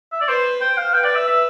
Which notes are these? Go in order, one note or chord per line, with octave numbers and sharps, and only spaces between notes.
E5
D5
B4 C5
C5 G5
F5
B4 G5
D5
E5
E5